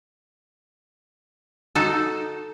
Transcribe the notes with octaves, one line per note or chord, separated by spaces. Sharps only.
D#4 F#4 A4